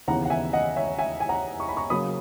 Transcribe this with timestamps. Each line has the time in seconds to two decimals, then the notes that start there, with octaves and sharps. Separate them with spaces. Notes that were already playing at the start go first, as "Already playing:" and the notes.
0.08 D#2 C#3 E3 B3 F#5 A#5
0.25 F#5
0.30 E5 G#5
0.53 D#5 F#5
0.77 C#5 E5
0.99 E5 G#5
1.20 G#5
1.29 F#5 A#5
1.60 C#6
1.69 B5
1.77 A#5 C#6
1.90 C#3 F#3 A#3 C#4 B5 D#6